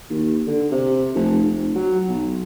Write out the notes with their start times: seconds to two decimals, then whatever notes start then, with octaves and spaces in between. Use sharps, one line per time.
0.10 D#2
0.47 D3
0.71 C3
1.15 F1
1.43 F1
1.75 F#3
2.09 B1